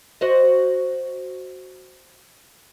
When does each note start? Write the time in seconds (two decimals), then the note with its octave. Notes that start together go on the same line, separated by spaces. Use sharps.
0.21 F#4 C5 D#5